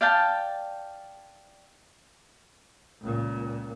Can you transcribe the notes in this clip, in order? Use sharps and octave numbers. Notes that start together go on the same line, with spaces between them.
D5 F5 G5 A5
C#2 A#2